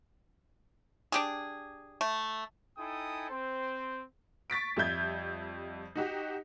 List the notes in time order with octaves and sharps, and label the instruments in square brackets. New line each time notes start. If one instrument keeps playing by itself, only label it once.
[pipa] D4 G4 G#4
A3
[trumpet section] D#4 E4 A4 G5 G#5 D#6
C4 C5
[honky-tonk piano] C#6 A6 B6 D7
F2 G3 E5 G6 G#6
D#4 F#4 G4